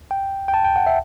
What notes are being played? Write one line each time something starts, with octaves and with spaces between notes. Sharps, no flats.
G5
G5
A5
G5
F#5
E5